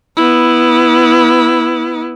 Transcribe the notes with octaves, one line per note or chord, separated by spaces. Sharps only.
B3 E4